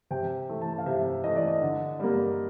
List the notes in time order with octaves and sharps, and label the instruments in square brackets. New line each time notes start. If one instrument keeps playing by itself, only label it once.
[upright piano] C3 G5
E3 A3
A5
F5
C3 E5
E3 A3 D#5
D5
D#5
D3
G3 A#3